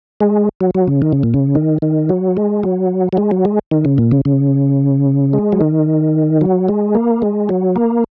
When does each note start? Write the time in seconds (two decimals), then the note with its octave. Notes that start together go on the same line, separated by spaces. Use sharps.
0.21 G#3
0.61 F#3
0.75 F#3
0.88 C#3
1.02 D#3
1.12 C#3
1.23 A#2
1.34 C#3
1.55 D#3
1.82 D#3
2.09 F#3
2.37 G#3
2.63 F#3
3.13 F#3
3.17 G#3
3.31 F#3
3.45 G#3
3.71 D#3
3.85 C#3
3.98 A#2
4.11 C#3
4.25 C#3
5.33 G#3
5.52 F#3
5.61 D#3
6.41 F#3
6.68 G#3
6.95 A#3
7.22 G#3
7.49 F#3
7.76 A#3